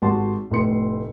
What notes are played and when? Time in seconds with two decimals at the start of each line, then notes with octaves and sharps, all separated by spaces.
0.02 G#1 F#4 G4 F#5 A5 C6
0.51 F1 A2 B3 C6 C#7